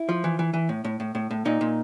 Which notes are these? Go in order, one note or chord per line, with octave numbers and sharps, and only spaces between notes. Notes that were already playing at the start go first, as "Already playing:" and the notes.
Already playing: E4
F3
E3
E3
E3
A2
A2
A2
A2
A2
A#2 D#4
A#2